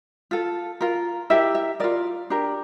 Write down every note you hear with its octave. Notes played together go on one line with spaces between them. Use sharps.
F4 A4
F4 A#4
E4 G4 A#4 E5
E5
F4 A#4 D5
D4 G4 A#4